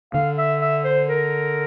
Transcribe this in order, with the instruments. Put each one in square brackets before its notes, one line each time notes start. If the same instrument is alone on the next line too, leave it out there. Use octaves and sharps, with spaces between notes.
[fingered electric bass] D3 [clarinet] F5
[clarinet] E5
E5
C5
A#4